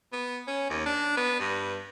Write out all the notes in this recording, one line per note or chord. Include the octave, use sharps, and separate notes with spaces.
B3
C#4
D#2
D4
B3
G2